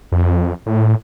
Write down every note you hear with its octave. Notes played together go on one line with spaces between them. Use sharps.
F2
A2